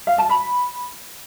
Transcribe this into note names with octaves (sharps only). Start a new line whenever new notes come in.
F5
A5
B5